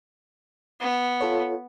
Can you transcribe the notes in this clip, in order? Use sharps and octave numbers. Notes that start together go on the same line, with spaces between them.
B3
F4 A4 C#5